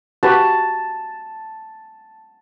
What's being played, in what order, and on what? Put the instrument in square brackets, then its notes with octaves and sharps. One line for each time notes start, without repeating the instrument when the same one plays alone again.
[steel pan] F#4 G4 B4 [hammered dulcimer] A5